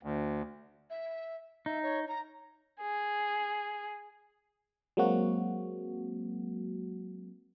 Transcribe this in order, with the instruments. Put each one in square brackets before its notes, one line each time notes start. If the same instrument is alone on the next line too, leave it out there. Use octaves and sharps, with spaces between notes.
[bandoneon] D2
[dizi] E5
[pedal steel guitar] D#4 [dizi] E5
[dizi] C#5
A#5
[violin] G#4
[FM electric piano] F#3 G#3 A#3 C4 F#4